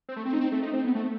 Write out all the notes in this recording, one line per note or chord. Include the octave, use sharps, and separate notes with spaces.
C4
A3
C4
D#4
C4
A3
D#4
C4
B3
A3